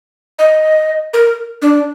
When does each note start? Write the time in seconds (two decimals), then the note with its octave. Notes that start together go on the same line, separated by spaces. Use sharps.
0.39 D#5
1.14 A#4
1.62 D4